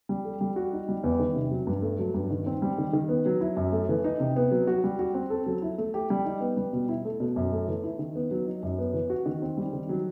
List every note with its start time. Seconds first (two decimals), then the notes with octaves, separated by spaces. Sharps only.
0.09 G3
0.25 A4
0.41 G3
0.56 F#4
0.73 D#4
0.89 G3
1.04 E2
1.19 D#3
1.35 C3
1.51 F#3
1.67 G2
1.82 A3
1.99 F#3
2.14 G2
2.30 D#3
2.46 C4
2.62 G3
2.78 D#3
2.93 D#3
3.09 B3
3.26 F#3
3.41 E4
3.57 F#2
3.72 A3
3.89 E3
4.04 D#4
4.20 C3
4.36 B3
4.51 F#3
4.67 F#4
4.84 G3
4.99 F#4
5.14 C4
5.30 A4
5.46 F#3
5.62 E4
5.78 A3
5.94 G4
6.10 G3
6.25 D#4
6.41 B3
6.57 G3
6.73 B2
6.89 E4
7.05 A3
7.20 B2
7.36 F#2
7.52 A3
7.68 E3
7.83 E4
7.99 D#3
8.15 B3
8.31 F#3
8.46 D#4
8.63 F#2
8.79 B3
8.94 E3
9.10 F#4
9.26 D#3
9.42 C4
9.57 G3
9.73 D#3
9.89 F#3